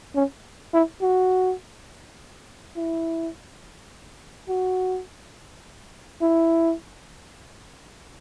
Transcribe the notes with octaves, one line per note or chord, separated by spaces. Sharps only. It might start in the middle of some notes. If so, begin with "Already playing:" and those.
C#4
E4
F#4
E4
F#4
E4